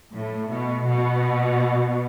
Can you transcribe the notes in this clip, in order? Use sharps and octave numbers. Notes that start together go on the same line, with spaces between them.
A2
B2
B2